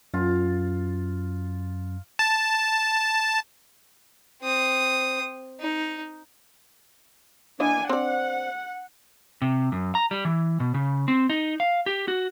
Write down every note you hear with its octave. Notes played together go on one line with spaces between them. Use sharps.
F#2 F4
A5
C4 D#6
D#4
E3 A#3 D4 D#5 G#5
C4 D5 F#5
C3
F#2
A#5
G3
E3
B2
C#3
C4
D#4
F5
G4
F#4